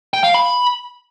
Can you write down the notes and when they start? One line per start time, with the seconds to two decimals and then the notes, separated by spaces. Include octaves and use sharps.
0.14 G5
0.24 F5
0.34 B5